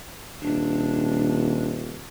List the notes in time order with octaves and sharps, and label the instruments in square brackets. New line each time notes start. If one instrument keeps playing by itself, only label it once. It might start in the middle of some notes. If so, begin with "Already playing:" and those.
[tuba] D#1 [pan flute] D4